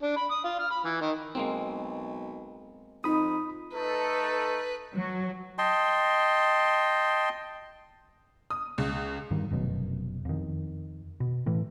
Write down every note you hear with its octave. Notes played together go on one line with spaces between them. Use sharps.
D4
B5
D#6
F4
F6
B5
E3
D#3
B1 G#3 A#3 C4
F2 D#4 B5 D#6
A3 D#4 A4 B4
F#3
D#5 G5 A5 C6
D#6
C#2
G2 D#3
F1 F#2 B2
F2 D#3
B2
A2 E3